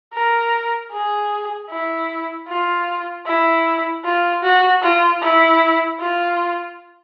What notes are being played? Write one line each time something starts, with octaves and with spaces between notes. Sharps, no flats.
A#4
G#4
E4
F4
E4
F4
F#4
F4
E4
F4